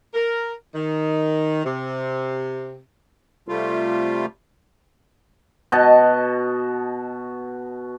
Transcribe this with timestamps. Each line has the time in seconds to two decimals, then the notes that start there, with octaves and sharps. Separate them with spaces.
0.14 A#4
0.75 D#3
1.65 C3
3.48 C3 G3 A3 F4
5.72 B2 F#4 D#5 A5